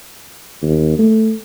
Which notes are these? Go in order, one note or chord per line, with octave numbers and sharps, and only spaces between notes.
D#2
A3